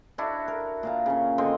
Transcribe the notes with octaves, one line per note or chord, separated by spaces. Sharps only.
D4 E4 F#4
A#4
A#2 F5 A#5
C#3 C#4
D3 C4 D#5 C6